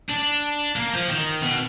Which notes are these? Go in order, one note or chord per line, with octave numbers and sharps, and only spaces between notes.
D4
A#3
F3
D#3
B2